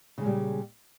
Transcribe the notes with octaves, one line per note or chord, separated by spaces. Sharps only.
A#2 C#3 G3 G#3